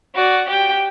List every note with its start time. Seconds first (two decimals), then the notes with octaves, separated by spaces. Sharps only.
0.15 F#4 D5
0.48 G4 G5